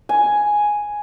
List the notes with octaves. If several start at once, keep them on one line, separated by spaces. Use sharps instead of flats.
G#5